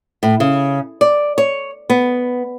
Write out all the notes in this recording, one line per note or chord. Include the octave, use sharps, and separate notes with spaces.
A2
C#3
D5
C#5
B3